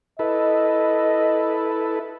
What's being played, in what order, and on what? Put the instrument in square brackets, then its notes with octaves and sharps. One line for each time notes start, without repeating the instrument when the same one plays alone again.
[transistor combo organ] E4 A4 B4 [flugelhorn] D#5